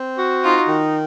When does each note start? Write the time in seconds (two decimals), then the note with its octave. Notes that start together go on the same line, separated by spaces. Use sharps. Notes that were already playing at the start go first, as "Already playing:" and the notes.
Already playing: C4
0.19 F#4
0.44 D#4 F4
0.68 D#3